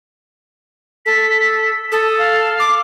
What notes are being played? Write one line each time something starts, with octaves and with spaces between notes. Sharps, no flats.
A4 B6
A4 D#6
F5
D6